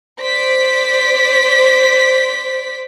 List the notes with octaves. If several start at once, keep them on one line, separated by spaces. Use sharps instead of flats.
C5 D5 B6